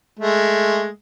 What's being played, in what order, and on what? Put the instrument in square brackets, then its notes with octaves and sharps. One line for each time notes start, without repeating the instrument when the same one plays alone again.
[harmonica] G#3 A3